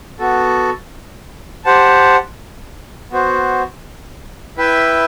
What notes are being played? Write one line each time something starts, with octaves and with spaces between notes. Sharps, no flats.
B3 F#4 A4
G4 C5 F#5 A5
B3 F#4 C5
E4 B4 E5 G5